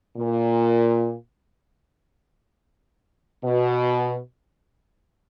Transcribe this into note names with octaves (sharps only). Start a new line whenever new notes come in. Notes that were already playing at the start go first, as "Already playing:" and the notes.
A#2
B2